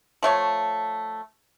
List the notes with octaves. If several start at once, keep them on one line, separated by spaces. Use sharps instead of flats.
F3 A3 C#5